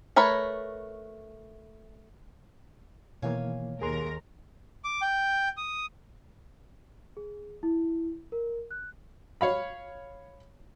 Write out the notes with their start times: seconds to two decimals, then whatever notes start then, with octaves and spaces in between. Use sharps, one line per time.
0.16 A3 A#4 B4 C#5 B5
3.22 B2 D#3 E3 A#3 C#5 F5 G#5
3.82 D#2 G#4 A#4 C6
4.85 D6
5.02 G5
5.57 D#6
7.17 G#4
7.63 E4
8.32 A#4
8.71 F#6
9.41 C#5 F5 B5